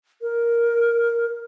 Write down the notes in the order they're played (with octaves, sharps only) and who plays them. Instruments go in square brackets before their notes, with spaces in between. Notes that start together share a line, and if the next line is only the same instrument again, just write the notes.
[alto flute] A#4